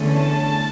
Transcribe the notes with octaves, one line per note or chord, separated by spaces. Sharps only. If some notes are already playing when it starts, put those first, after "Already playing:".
Already playing: E2 D3 A3 C#4
A5